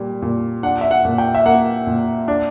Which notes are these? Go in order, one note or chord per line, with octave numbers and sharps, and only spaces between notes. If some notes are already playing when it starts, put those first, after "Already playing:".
Already playing: A#2 G3
A#2
D4 F#5
E5
F#5
A#2
G5
E5
A#3 F#5
A#2
D4